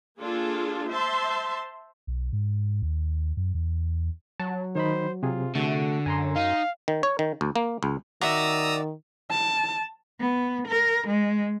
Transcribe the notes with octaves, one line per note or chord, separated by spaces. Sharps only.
A#3 D4 F4 G#4 A4
C5 E5 A5 C6
B1
G#2
D#2
F#2
E2
F#3 A5
D#3 D#4 C5 B5
C3 F4 G#4
D3 A3 F#4
F#2 G#5 A#5 C6
D#4 F5
D#3
C#5
D#3
D2
A#3
C#2
D#3 F#4 D5 E5 A#5 D#6 E6
A5
B3
A#4
G#3